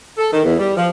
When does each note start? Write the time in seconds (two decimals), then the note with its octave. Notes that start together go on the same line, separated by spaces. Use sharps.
0.18 A4
0.33 D#3
0.44 E2
0.59 G3
0.77 F3